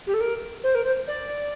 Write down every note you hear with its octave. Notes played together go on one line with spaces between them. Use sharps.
G4
A4
A#4
C5
A#4
C5
D5